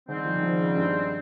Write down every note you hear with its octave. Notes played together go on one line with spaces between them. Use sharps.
G#2 D#3 G3 C4
F3
D#3
F3
C#3
G2